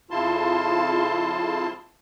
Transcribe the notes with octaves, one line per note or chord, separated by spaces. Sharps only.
F2 C#3 E4 F4 A5 C6